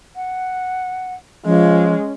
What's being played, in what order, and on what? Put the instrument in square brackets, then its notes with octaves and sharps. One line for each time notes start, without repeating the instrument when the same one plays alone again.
[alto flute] F#5
[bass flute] F3 [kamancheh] G#3 [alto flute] C#4